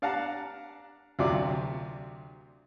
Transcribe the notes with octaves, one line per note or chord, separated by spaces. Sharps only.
D4 F5 F#5 A5 A#5
D2 C3 F#3 F4 D5